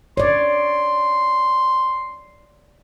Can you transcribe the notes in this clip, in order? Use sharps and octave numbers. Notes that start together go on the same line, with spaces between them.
C#5 D5 C6